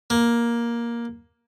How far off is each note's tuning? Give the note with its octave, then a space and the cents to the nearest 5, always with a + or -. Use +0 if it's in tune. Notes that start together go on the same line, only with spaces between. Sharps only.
A#3 +10